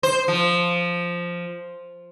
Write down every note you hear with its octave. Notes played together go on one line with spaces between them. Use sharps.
C5
F3